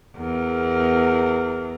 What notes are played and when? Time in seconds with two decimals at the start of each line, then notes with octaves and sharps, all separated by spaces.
0.16 E2 A#4